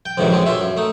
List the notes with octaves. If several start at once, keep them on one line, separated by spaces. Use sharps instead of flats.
G5
F2 G#2 C3 D#3 E3 F#3
F#2 G#3 C4 C#4
B1 C#4 F4 E5
F#2
A3 D#4